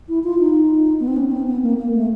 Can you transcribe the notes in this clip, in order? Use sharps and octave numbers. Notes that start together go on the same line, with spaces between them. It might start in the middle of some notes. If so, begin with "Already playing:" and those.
E4
F4
D#4
B3
C4
C#4
C#4
C4
B3
A#3
A#3
A3